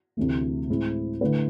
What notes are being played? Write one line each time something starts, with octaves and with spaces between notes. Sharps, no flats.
D2 C3 E3 A3
A2 G#3 C4 E4
D3 A3 E4 B4